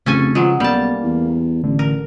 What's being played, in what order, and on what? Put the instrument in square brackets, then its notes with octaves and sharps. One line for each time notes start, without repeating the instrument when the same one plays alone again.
[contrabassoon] F1 [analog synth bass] C#3 [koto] C#4 A4 G#5
[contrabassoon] F3 [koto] F#3 G#3
[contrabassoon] B1 [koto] G3 A5 [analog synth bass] A#3
[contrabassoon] E2
[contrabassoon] A1 [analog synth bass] D3
[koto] A#4